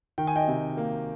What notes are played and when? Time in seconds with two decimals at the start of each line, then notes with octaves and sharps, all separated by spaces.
0.18 D#3 G5
0.27 G#5
0.35 D#5 G5
0.48 C3
0.77 A#3